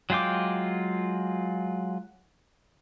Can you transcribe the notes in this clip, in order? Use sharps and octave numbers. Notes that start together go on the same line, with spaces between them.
F#3 G#3 F4 G5 D6